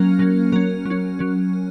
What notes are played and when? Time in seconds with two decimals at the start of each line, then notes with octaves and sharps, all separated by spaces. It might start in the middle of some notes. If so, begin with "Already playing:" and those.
Already playing: F#3 A#3 C#4 A#4
0.19 F#3 A#3 C#4
0.52 F#3 C#4 A#4
0.85 F#3 C#4
1.19 F#3 C#4